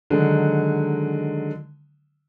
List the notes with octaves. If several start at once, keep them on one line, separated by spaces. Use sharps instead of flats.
D3 D#3 F#3 G#3